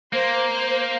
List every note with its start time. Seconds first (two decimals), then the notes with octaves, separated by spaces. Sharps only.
0.13 A#3 C5
0.48 C5